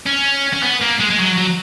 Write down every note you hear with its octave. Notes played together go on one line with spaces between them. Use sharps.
C#4
C#4
B3
A#3
G#3
G#3
F#3
F#3